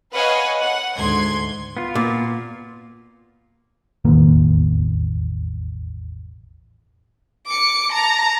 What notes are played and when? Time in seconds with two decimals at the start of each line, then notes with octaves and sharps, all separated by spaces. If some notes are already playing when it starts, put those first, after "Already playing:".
0.13 B4 C#5 D#5 F5 F#5 G#5
0.62 F#5
0.96 D2 G#2 C6 G#6
1.77 B3 F4
1.95 A#2
4.05 E1 A1 D#2 A#3
7.46 D6 C#7
7.92 A5 A#5